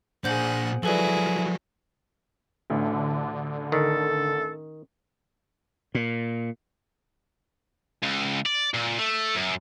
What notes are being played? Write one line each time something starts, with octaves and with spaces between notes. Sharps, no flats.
A#2 D4 G#4 C5 F#5 G6 F#7
F3 F#3 E4 G#4 A4 B4 D5
A1 D2 D3
D#3 A4
A#2
C#2
D5
A#2
A3
F#2